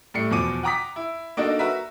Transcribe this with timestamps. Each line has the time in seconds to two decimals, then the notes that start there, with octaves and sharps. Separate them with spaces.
0.14 A2 G3 A3 C7 C#7
0.30 E2 B2 F3 D6 D#7
0.63 F#5 G5 A#5 D6 D#6 B6
0.96 E4
1.37 A#3 D4 D#4 F#4 A4 D#5
1.59 F#4 A#4 B4 E5